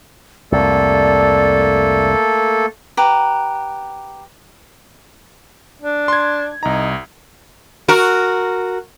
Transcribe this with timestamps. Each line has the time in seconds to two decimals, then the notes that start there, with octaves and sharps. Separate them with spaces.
0.52 C2 F2 A3 A#3 A4 D5
2.97 G4 B4 F#5 A#5
5.82 D4
6.08 C6 G#6
6.63 C2 D#4 A#5
7.88 F#4 A#4